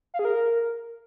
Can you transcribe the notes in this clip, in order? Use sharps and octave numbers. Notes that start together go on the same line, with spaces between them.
F5
G#4
A#4